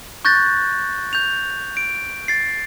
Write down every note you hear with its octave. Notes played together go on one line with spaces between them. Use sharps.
C#6 F#6 G6 A6 A#6
G6 F7
D7
A6 C7